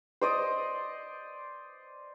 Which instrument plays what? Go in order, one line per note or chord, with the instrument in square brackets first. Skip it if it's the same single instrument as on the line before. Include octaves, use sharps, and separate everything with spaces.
[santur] C5 D5 D#5